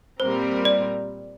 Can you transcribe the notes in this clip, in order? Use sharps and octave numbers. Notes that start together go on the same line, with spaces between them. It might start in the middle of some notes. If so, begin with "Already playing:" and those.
A#2 G3 C4 A#4 C5
D5